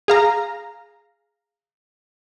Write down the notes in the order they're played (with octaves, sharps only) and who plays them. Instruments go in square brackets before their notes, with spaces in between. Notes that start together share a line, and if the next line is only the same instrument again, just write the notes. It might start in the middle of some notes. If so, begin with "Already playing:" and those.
[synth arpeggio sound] G#4 F5 A#5